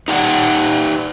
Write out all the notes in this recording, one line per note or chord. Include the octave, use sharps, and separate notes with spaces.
D#4 G4 D5 F#5